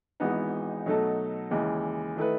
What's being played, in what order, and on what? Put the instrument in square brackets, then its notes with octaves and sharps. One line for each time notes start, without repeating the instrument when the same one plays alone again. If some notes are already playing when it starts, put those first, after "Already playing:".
[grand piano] G#1 G#2 E3 B3 D#4
B2 F#3 A3 D#4 A4
D#2 C#3 E3 G#3
D#3 A3 E4 B4